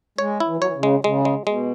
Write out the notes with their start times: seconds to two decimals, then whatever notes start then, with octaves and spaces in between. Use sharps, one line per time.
0.18 G#3 C#5
0.40 E4
0.47 E3
0.57 F#3
0.62 E3 C#5
0.76 C#3
0.83 G#3
1.04 C#3 G#3
1.25 G#3
1.47 B2 G#3